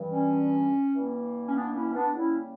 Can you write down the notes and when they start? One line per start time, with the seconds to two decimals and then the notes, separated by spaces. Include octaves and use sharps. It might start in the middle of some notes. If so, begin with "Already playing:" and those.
Already playing: G2 E3 G3
0.11 C#4
0.92 G2 E3 A#3
1.47 C#4
1.54 B3 D4
1.74 C#4 E4
1.94 B3 D4
2.15 C#3 G3 A#3 C#4 E4